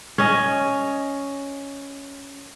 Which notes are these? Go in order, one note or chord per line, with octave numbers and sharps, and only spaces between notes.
C#4 D#5